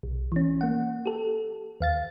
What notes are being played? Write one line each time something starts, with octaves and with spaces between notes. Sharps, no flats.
B1
E3 C#4
A#3 F#5
G4 A4
D#2 F5 A6